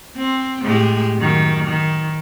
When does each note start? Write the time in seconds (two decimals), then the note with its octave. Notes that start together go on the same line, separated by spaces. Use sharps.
0.17 C4
0.63 A2 G#3 G4
1.18 F#2 D#3
1.68 D#3